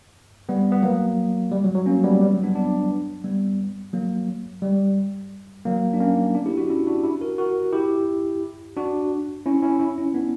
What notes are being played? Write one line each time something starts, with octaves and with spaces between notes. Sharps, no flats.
G3 B3
B3
F#3 A#3
G3
F#3
F#3
A#3 C#4
G3 B3
G3
F#3
B3 D4
B3 D4
G3 B3
F#3 A#3
G3
F#3 A#3
D4
A#3 C#4
B3 D4
E4 G4
D4 F#4
C#4 E4
D4 F#4
E4 G4
F#4 A#4
F#4 A#4
E4 G4
D4 F#4
C#4 E4
C#4 E4
C#4 E4
C#4 E4
B3 D4